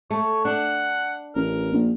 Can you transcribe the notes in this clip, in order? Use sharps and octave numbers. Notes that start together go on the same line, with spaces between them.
A3 C#5
D4 F#5
A1 A#4
A#1